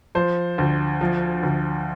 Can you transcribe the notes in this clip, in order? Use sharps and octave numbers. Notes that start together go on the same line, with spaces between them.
F3 C5
D2
F3
D2